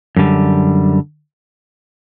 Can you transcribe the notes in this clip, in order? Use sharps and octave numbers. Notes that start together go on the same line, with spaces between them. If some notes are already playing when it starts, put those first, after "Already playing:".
F#2 D3 G3